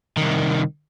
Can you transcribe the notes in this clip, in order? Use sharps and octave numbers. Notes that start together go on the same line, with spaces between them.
C2 D#3